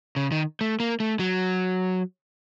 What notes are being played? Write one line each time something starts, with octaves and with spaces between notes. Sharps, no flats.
C#3
D#3
A3
A#3
A3
F#3